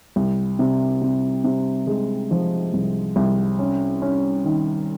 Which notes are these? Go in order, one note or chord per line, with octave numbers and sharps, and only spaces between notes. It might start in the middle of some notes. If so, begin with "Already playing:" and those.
C2
C3
C3
C3
G#3
F3
C2
C2
C#4
C#4
D#3